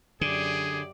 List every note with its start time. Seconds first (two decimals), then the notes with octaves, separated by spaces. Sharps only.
0.21 F#2 D3 G4 G#4 D5